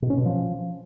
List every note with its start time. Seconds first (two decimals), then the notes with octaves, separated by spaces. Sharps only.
0.02 B2
0.10 C#4
0.18 B2
0.26 F3